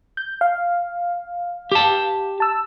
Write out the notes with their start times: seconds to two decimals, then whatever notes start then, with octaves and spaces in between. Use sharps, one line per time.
0.17 G6
0.41 F5
1.72 G4 A5
2.40 A5 E6